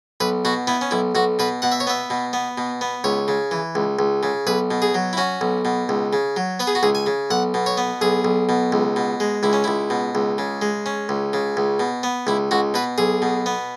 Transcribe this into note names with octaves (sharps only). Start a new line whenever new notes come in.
B1 B4
B2 F#4
B3 E4
C#4
B1 E4
B1 F#4
B2 B4
B2 F#5
E5
C#5
B3 E5
B2
B3
B2
B3
C#2 C#5
C#3
E3
C#2
C#2
C#3
B1 B4
B2
G#4
F#3
E4
C#4 F#4
B1
B2
C#2
C#3
F#3
B3 B4
G#4
F#4
C#2 G#4
G#5
C#3
B1 F#5
B2
C#5
B3
B1 G#4
B1
B2
C#2
B2
G#3
C#2 E4
C#4
C#2 E4
B2
C#2
C#3
G#3
C#4
C#2
C#3
C#2
B2
B3
C#2 E4
C#2 F#4
B2 B4
B1 G#4
B2
B3